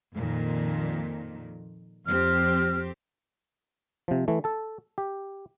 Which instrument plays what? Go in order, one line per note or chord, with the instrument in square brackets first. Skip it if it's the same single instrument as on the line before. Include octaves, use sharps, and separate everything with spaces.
[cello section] F2 A#2 D#3
[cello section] F2 C4 G4 [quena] F6
[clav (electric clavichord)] C3 F3
E3 A3
A4 A5
G4